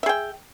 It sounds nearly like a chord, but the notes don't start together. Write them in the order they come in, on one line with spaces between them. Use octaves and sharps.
E5 G#4 G5